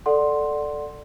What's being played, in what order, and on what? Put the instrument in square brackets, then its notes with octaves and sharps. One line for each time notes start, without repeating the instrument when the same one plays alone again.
[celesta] A4 D5 F#5 C6